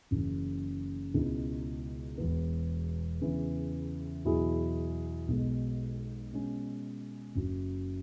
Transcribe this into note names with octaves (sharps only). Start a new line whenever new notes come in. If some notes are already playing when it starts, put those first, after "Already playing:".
F#1 F#2 C#3 E3
C#2 B2 G#3 E4
E1 E2 B2 B3
E2 C#3 E3
E2 B2 F#3 E4 G#4
B1 B2 G#3
B2 G#3 C#4
F#1 F#2 F#3